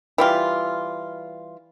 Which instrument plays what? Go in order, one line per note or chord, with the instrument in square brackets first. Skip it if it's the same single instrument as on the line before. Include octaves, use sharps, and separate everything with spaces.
[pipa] E3 G3 F4